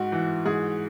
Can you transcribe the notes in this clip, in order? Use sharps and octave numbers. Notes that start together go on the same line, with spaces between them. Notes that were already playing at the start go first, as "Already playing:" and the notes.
Already playing: G#2 F#4
E3
G#2 G#4